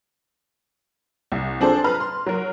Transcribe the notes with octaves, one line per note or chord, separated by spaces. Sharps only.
C2
F3 C4 D4 G#4 A4 C5
B4 A#5 F6
C6
F#3 A#4